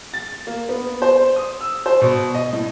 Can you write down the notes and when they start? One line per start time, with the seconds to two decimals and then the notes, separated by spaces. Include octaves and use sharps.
0.14 A6
0.47 A#3
0.69 B3
1.02 C5
1.36 D#6
1.61 E6
1.86 C5
2.01 B2
2.35 D#5
2.53 A2